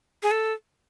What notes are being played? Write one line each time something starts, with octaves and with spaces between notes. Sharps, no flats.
G#4
A4